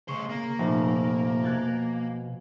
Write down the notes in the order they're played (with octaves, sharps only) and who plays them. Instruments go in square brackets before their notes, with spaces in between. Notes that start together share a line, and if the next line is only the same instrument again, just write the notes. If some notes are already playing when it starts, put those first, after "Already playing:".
[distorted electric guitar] A2 C5 [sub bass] C#3 [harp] C#6
[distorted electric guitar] A#3
[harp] F1 [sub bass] A#2
[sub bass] B2 [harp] F#6 G#6 A6